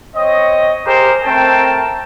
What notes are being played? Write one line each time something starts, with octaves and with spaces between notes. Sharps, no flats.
C4 C#5 D#5
G4 G#4 A#4 C5
A3 C4 A#4 G5 A5